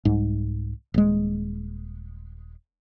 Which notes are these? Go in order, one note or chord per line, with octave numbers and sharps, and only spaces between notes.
C2 G#2
D#1 G#3